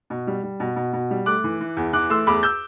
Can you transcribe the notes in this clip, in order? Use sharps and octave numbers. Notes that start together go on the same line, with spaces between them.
B2
G3
G3
B2
B2
B2
G3
A3 D6 F#6
E3
E3
E2
E3 D6 F#6
A3 C6 E6
E2 B5 D6
E6 G6